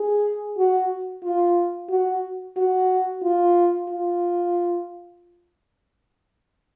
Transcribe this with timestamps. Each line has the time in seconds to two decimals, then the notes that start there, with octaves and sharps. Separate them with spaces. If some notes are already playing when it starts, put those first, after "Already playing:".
Already playing: G#4
0.58 F#4
1.24 F4
1.90 F#4
2.57 F#4
3.23 F4
3.89 F4